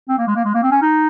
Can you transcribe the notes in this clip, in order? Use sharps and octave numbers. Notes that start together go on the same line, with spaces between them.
C4
A#3
G#3
A#3
G#3
A#3
C4
C#4
D#4